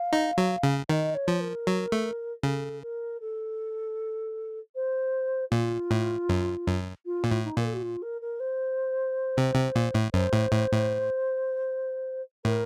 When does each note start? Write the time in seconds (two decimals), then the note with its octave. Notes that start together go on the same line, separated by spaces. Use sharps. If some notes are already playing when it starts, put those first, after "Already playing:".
Already playing: F5
0.13 D#4
0.38 F#3
0.63 C#3
0.89 D#3 D#5
1.15 C#5
1.28 F3
1.40 A#4
1.67 F#3
1.92 A3
2.43 C#3 A4
2.83 A#4
3.21 A4
4.75 C5
5.51 A#2 F4
5.91 A2
6.29 F#2
6.67 F#2
7.06 F4
7.24 A#2
7.31 A2
7.45 D#4
7.57 A#2 A#4
7.65 A4
7.74 F#4
7.82 F4
8.02 A#4
8.21 A#4
8.40 C5
9.37 C3
9.55 C3
9.75 A#2
9.94 A2
10.14 F#2 C5
10.33 A2
10.52 A2
10.72 A2
12.45 A2 A#4